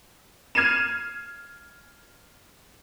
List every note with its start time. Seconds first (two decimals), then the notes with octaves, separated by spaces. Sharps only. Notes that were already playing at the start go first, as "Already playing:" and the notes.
0.55 F6 G#6 C7 D#7 E7